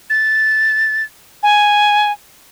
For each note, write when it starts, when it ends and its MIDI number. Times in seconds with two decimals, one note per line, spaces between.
0.10 1.04 93
1.43 2.12 80